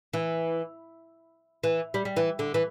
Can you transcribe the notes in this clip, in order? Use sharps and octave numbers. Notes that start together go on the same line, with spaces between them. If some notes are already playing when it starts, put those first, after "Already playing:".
E3
E3
G3
G3
E3
D3
E3